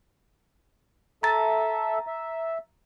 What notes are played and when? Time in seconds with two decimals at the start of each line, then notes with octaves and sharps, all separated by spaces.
1.23 A4 E5 A#5 A6
2.07 E5